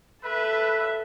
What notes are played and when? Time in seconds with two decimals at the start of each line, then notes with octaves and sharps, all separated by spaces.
0.24 A4 B4 E5